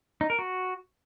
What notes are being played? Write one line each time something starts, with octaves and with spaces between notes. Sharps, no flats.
D#4
A#4
F#4